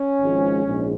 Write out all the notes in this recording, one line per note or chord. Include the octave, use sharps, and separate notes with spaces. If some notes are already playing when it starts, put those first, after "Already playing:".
Already playing: C#4
G#1 G#2 F3 G#3
A#1 G#2 G#3